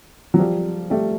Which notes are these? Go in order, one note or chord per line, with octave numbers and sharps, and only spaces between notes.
F#3
F3 G3
G3 A3